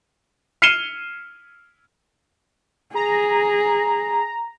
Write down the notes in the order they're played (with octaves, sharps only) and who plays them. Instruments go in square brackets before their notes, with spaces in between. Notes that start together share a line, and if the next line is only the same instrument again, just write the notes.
[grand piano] F6 C7 C#7 D#7 E7 G7
[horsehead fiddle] G#4 [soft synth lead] A#5